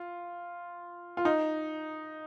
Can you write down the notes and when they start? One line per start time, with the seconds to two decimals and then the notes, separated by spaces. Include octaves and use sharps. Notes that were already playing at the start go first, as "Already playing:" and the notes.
Already playing: F4
1.17 F4
1.25 D#4